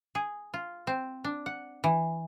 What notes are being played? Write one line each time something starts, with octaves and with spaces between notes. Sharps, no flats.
G#4
F4
C4
D4
F#5
E3